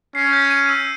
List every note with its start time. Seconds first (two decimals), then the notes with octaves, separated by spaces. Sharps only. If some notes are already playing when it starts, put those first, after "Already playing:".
0.15 C#4 C7
0.33 G6
0.50 D#7
0.69 E6